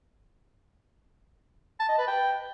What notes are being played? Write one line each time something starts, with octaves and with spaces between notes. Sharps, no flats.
A5
D#5
B4
G5